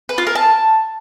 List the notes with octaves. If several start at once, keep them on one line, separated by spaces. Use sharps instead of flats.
B4
F4
A#4
A5